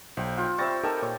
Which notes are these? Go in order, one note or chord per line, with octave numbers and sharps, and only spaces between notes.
B1 C5 G5
F4 G5
G3 C4 E5 C#6 A6 A#6
D#4 G4 A4 A#4 A5 E6
A#2 C#5